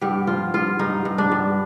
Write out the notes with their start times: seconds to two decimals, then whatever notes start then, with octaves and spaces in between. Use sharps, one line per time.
0.01 G2 G4
0.27 F3 F4
0.54 G2 F4
0.79 G2 D#4
1.05 G2
1.18 D4
1.32 G2